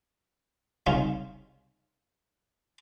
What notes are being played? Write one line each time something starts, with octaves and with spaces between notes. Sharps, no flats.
C2 C#3 D#4 F4 F5 C#6